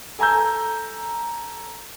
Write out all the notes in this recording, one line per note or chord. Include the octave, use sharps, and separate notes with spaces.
A4 G#5 A#5 E6 G6